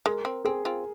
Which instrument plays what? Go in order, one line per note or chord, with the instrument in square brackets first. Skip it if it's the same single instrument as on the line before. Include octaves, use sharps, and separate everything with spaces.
[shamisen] G#3 [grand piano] A#4
[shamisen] C4
[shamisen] C4 [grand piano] G#4
[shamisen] C4 F4